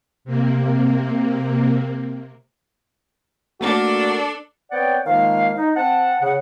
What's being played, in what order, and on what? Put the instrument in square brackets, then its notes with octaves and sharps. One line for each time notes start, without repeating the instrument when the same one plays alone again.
[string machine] C3 A#3
[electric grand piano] A3 A#3 A#4 [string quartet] D4 A4 [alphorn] F#4
[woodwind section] B3 C4 C#5 D5 F#5 G5
D#3 F3 G#3 A#3 F5
D#4
C4 F#5 A5
C#3 F#5